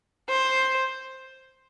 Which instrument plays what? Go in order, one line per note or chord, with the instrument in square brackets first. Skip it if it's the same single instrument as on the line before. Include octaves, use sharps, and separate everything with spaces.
[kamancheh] C5